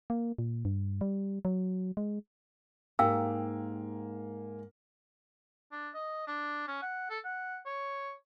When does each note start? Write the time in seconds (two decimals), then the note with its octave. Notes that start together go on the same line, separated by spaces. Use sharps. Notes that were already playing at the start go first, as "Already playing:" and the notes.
0.10 A#3
0.38 A#2
0.65 G2
1.01 G3
1.45 F#3
1.97 G#3
2.99 G#2 A#3 G4 F5 G5 E6
5.72 D4
5.94 D#5
6.27 D4
6.68 C#4
6.82 F#5
7.10 A4
7.24 F#5
7.66 C#5